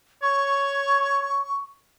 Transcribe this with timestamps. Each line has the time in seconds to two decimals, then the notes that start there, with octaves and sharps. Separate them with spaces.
0.22 C#5 C#6